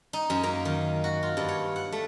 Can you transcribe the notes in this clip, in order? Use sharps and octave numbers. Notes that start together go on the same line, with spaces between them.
D#4
F#2
A#3
D#3
F#4
F4
G2
C#5
F#5
A3